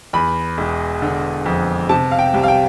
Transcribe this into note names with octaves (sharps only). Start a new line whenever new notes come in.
E2 B5
E1
D3
F2
C3 A5
F5
G5
C2
F5
G5